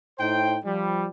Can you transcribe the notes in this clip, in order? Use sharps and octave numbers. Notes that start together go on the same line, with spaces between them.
A2 D#4 C5 G5
F3 G3